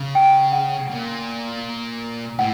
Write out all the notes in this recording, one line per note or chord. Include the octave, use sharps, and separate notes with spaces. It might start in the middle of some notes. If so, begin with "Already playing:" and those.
Already playing: C#3
G5
F#5
A#2
A2 F#5